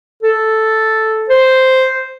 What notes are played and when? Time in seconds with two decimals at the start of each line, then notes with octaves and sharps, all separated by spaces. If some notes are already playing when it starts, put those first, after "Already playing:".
0.23 A4
1.29 C5